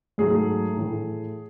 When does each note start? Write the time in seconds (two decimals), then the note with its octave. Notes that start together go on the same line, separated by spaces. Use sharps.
0.18 G#2 F#3 A3 G#4
0.76 A2 E3 A3